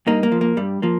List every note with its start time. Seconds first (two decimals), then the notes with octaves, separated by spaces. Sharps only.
0.07 G2 A#3 D#4
0.23 A#3
0.32 F3
0.41 A#3
0.57 G2 G3
0.82 F3 A#3